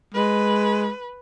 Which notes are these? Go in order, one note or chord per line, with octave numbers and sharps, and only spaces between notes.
G#3 B4